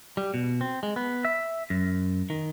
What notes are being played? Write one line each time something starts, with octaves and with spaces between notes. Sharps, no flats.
G3
B2
C4
G#3
B3
E5
F#2
D#3